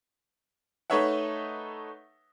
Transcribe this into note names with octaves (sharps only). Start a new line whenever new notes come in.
A3 D#4 B4 C#5 E5 F#5